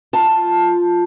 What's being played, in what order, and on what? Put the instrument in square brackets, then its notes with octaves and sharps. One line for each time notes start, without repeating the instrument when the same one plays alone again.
[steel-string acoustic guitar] F4 A5